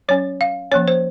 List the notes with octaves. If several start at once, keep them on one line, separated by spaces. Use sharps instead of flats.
F#3 C#4 C#5
F5
F3 A#3 C#4 C#5
C5